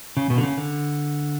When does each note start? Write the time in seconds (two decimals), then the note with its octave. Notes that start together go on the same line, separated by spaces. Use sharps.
0.17 C#3
0.30 B2
0.38 D3
0.43 C#3
0.58 D3